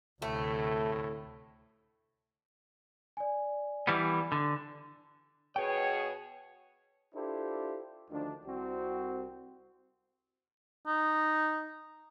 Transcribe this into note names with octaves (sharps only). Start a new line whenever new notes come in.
D2 A2 C3 A3
D5 G#5
E3 G3 B3
D3
B2 G#4 B4 C#5 G5
D4 E4 F4 G4 A4 C5
D2 D#3 F3 D4
C2 C4 F#4
D#4